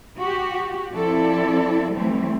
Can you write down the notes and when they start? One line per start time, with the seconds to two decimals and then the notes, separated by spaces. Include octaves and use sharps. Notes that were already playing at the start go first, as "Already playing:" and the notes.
0.18 F#4 G4
0.92 F3 C4 E4 A4 D5
1.94 E3 F#3 G3 A3 C4